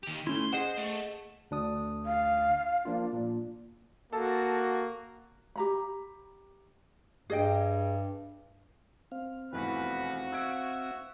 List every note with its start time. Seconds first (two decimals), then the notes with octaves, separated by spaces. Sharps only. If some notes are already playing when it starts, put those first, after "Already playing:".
0.03 D#3 G4
0.27 A3 C#4 E4 C6
0.53 G#4 C5 D#5 F#5
0.78 A3
1.51 D2 D4 D#6
2.05 F5
2.85 F3 A#3 D4 F4
3.13 A#2
4.13 A#3 F#4 A4
5.56 G4 A#5 B5
7.30 G2 G#4 D#5 G5
9.12 C4 F5
9.53 F1 E2 E3 F#4 B4
10.33 E5 F#6 G#6 D7